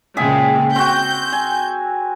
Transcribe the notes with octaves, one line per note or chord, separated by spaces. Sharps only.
A#2 C#3 G#3 G#4 E5 G5
C4 F#4 G6
G#5